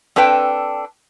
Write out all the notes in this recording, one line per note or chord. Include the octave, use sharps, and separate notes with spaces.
C4 D4 A4 B4 G5